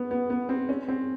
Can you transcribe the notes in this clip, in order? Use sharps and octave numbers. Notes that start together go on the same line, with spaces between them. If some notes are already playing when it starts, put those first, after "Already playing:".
Already playing: B3
B3
B3
C4
C#4
C4